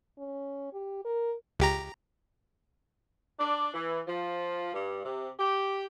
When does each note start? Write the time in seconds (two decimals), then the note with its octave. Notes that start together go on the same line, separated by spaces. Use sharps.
0.18 C#4
0.73 G4
1.05 A#4
1.59 C#2 G4 A#5
3.39 D4
3.74 E3
4.07 F3
4.73 G2
5.05 C3
5.39 G4